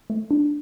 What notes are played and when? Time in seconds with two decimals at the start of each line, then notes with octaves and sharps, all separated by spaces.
0.10 A3
0.31 D4